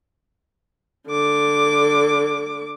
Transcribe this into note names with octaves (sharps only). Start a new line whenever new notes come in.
D3 D6